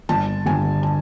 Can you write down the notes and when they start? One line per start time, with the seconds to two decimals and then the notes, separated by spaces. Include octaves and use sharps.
0.09 G1 A5
0.46 G2 D3 G#5
0.83 A5